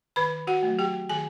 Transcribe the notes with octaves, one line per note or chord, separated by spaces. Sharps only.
D#3 B4 B5
F#4 F#5
F#3 A3
G4 G5
D#3 G#4 G#5